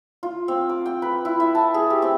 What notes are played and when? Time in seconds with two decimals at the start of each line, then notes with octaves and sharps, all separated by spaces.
0.23 F4
0.48 C4
0.69 D6
0.86 G5
1.02 B4
1.25 E4
1.40 E5
1.55 A5
1.74 G#4
1.90 G4
2.02 C4